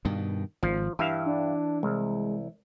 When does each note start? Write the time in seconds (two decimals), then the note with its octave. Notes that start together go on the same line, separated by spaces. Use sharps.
0.05 G2 B2 D#3
0.63 G#1 F3
0.99 G2 E3 E5 F5
1.26 D4
1.83 C2 G#3